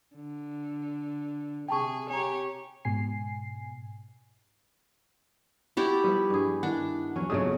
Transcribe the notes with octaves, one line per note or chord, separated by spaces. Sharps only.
D3
C3 G#4 G5 A5 C#6
G4 C#5 G#5 A#5
G#2 B2 G#5 C7
E4 F#4 G4 D5
F3 G3 B3
G2 G#4
D#3 D4 E4 F#5
E2 F#3 C#4
B1 F2 C#3 F#3 A3 G#4 D#6